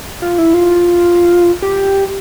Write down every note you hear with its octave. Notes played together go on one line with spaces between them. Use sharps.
F4
E4
F4
G4